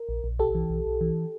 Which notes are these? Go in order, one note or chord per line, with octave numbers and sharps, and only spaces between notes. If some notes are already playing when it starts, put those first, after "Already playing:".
Already playing: A#4
A#1
A#1
B1 G4 A4
E3
B1
B1
E3